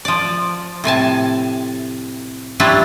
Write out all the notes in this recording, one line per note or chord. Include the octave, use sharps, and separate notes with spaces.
F3 D5
A2 C3 G#5 A5
F#3 D4 E4 F4 G4